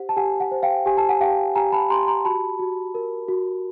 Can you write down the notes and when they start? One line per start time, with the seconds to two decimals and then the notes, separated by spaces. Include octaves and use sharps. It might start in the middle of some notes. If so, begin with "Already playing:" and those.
Already playing: G4 C5 F#5
0.09 A5
0.17 G4 F#5 G#5
0.40 F#5
0.51 C5
0.63 F5 G5
0.86 G4 G#5
0.97 A5
1.09 F#5 G#5
1.20 G4 F5 G5
1.55 G4 G#5 A#5
1.72 A5 B5
1.90 G4 A#5 C6
2.07 A#5 C6
2.25 F#4 A5 B5
2.59 F#4
2.95 A#4
3.28 F#4